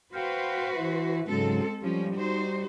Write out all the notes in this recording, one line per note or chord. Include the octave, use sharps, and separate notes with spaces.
F#4 B4 C5 F5 G5
E3 E4
G#2 C#3 F#3 G#3 C4 A4
F3 G3 C#4
D#4 F#4 C5